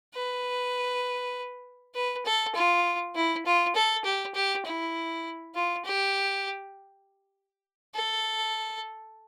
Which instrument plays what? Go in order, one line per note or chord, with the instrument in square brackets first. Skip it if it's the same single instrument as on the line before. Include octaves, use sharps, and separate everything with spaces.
[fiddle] B4
B4
A4
F4
E4
F4
A4
G4
G4
E4
F4
G4
A4